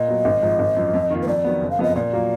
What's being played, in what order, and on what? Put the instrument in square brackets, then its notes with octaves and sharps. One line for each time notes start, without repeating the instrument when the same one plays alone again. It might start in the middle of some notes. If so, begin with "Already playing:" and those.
Already playing: [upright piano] A#2 [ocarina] D#5
[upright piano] F#3 B3
G#1
G#2 F3
G#1
F#2 F3
F2
D#3 A#3 F4
[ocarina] B4
[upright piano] F2 [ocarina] D5
[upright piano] D#3 F#3 B3
F#1
[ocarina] F5
[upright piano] F2 F3 B3 F4 [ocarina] D#5
[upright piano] A#2 [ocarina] D5
[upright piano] F#3 A#3 F4